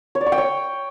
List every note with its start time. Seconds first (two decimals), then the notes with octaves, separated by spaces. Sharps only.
0.15 C#5
0.21 D5
0.26 C#6
0.32 G5
0.38 C#5